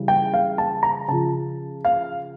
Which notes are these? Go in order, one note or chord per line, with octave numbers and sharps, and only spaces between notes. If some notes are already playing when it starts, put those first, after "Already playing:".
Already playing: C#3 E3 G3
G5
F5
A5
A#5
C#3 F3 A5
F5